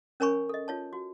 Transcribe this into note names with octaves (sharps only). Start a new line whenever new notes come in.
C#4 A#4 C#5 G#5 B5 C#6
A4 D#5
F4 C#5 A5
F#4